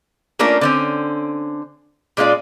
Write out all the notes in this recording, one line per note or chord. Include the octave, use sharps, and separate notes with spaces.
A3 A#3 C#4 D4 F4 A#4
D3 C4 C#4
A#2 G#3 C#4 F4 D5